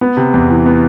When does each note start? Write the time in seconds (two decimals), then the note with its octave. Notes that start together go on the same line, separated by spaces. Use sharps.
0.01 B3
0.17 C3
0.34 E2
0.50 E3
0.66 B3